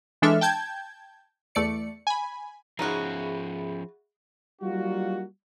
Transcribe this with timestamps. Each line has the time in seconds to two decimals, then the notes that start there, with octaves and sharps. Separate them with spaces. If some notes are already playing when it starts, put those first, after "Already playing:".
0.22 E3 G#3 D4 A4 E5 F6
0.41 G5 A5 G6 G#6
1.55 E2 A3 D5 C#7
2.07 G#5 B5
2.79 F3 C#4 D#4 F4 F#4 G#4 E5 B5
4.62 F#3 G3 A#3 D#4 F4 F#4